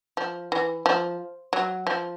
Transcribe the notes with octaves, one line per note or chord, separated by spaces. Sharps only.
F3
E3
F3
F#3
F3